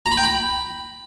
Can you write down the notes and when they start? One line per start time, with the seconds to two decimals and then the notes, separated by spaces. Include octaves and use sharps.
0.06 A#5
0.12 B5
0.17 G5
0.23 B5